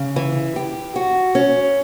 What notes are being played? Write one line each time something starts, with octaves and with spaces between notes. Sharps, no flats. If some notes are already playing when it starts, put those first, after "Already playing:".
Already playing: C#3
E3
G4
F#4
C#4